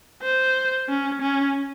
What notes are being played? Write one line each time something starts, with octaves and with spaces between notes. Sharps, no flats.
C5
C#4
C#4